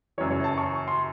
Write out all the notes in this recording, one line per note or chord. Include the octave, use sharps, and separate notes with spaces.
F#1 F#2 E3 C#5
C#5
A5
C#6
C6